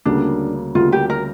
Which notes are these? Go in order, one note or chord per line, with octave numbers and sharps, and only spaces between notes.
D2 C#3 G3 A#3 D4
D2 C#3 G3 A#3 F4
G4
A#4